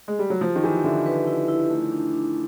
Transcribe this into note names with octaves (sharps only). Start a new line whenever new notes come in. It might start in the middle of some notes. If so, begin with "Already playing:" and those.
G#3
G3
F#3
F3 G4
D#3
E3 G4
D3 E5
B4
E4
E4
A3
D4
D4